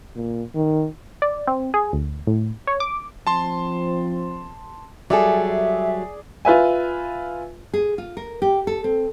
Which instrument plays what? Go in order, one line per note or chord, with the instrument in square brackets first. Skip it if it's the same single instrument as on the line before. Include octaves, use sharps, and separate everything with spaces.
[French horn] A#2
D#3
[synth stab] D5
C4
G#4
D2
A2
C#5
D6
[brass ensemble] F3 C4 [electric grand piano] A5 C6
[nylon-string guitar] F#3 G3 A4 [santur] G#4 D5 [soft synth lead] E5
[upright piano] F4 B4 E5 G#5
[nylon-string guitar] G#4
F4
A#4
G4
A4
C4